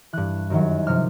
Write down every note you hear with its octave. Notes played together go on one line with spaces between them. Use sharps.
G2 E3 F#6
F#2 D#3 F#3
C3 F3 F6